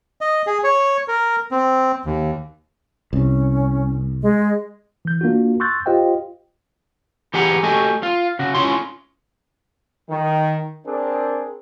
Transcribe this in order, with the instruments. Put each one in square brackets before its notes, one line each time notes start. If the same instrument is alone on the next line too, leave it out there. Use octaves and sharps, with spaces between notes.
[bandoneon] D#5
G#4
C#5
A#4
C4
D#2
[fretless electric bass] C2 [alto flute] C#4
[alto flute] G#3
[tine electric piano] E3 G6
A#3 D4 F4 F#4
C6 C#6 E6 F#6 G6 A6
F4 G4 C5 D#5 F5 G5
[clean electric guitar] E3 G4 G#4 B4 F#5 A#5
A3 F#4 G4 D#5 G#5
F4
C#3 F#4
C#4 E4 F4 C#5 C6
[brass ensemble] D#3
C4 D4 G#4 A#4